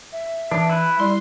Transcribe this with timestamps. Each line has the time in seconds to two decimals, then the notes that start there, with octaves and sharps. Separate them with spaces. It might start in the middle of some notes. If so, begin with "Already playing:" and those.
0.12 E5
0.51 E3 D4
0.70 E4 B4
1.00 G3 E4 C6